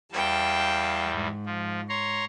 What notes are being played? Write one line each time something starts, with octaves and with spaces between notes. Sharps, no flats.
E2 G3 F5 G5 A5
G#2
F3
C#5 A#5 C6